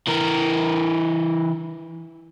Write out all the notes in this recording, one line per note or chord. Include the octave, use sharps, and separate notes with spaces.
E3 A#4